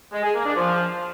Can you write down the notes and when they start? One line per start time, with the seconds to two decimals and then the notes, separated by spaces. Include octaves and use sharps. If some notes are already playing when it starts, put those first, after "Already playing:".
0.12 G#3
0.23 G#4
0.34 A#3
0.45 D4
0.56 F3